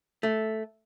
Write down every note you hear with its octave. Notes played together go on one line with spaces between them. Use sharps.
A3